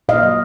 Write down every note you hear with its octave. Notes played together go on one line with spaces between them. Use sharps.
A#2 D#5 F5
F#3